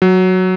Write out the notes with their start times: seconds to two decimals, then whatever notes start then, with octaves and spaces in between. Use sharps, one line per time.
0.02 F#3